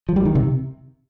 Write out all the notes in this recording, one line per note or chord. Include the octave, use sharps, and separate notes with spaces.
F3
G3
D#3
C3